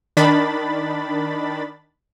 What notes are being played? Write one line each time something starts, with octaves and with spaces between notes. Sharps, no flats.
D#3 D4 B5 A6